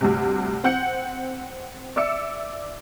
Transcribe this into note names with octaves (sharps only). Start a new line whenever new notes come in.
D2 G2 C3
C4 F#5 G6 C#7
D5 E5 D6 E6 C#7